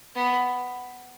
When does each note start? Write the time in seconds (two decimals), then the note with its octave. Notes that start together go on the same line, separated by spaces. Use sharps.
0.15 B3